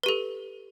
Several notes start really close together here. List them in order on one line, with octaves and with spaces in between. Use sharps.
B4 G4 A4